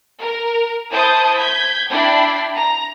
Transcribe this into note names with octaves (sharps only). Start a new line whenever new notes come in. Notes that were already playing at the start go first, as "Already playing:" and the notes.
A#4
E4 C5 A5 D#6 G6
G6 G#6 B6
D4 E4 G5 B5 C7
A#5